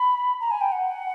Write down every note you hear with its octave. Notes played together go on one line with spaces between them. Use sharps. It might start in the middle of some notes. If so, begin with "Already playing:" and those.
Already playing: B5
A#5
G#5
G5
F#5